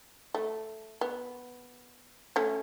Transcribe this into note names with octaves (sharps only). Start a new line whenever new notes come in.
A3
B3
A3 C#4